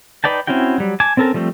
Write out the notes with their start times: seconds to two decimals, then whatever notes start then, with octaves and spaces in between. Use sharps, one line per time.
0.24 D#4 B4 D5 G5 A5
0.47 C4 C#4 E4 F#4 G5
0.78 F#3 G3
1.00 G#5 A5 D6
1.17 C4 C#4 A4 A#4 A5
1.34 F3 G3 A3 C4